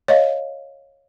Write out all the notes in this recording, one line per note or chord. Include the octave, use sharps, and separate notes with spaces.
C#5 D#5 F5